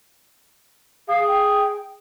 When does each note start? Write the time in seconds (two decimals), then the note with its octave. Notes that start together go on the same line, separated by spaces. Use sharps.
1.08 G#4 F5
1.28 G5